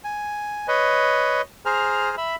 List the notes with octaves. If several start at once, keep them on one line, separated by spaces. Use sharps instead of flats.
G#5
B4 C#5 D#5
G#4 C5 G#5 A#5 F6
E5 B5